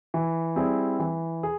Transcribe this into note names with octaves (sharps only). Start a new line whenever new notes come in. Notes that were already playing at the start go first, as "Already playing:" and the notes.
E3
G3 C4 E4 G#4
E3
G#4